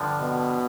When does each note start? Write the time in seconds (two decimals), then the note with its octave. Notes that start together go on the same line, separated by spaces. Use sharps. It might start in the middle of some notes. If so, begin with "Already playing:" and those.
Already playing: G2 D3 F3
0.21 B2